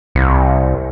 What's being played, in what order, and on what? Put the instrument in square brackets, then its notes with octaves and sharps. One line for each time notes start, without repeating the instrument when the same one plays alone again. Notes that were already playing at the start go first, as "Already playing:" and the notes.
[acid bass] C2